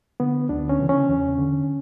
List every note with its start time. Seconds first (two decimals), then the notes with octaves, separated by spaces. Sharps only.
0.20 D3 B3
0.49 D2 D4
0.69 C#4
0.80 C#3 E3
0.89 C#4
1.09 E2
1.38 D3